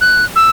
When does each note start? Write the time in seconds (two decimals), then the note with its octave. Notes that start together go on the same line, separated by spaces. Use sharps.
0.01 F#6
0.36 E6